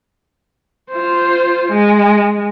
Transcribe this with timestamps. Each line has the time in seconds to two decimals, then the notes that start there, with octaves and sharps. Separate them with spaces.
0.92 F4 C5
1.72 G#3